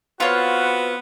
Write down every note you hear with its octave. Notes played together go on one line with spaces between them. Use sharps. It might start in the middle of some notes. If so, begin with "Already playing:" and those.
B3 C4 F4 F#4 B4 C#5